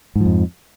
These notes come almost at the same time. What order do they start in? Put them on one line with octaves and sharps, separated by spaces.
G#2 F3 F2